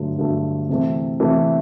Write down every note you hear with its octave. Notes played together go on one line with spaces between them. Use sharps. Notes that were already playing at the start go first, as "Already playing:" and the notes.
Already playing: G2 D3 F#3 A3
G2 D3 F#3 A3
C3 E3 A3
C3 E3 A3